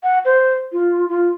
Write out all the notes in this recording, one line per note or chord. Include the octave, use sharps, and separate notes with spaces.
F#5
C5
F4
F4